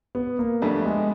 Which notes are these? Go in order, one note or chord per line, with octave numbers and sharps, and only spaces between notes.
B3
A#3
F2 D3 G3 A3 B3
G#3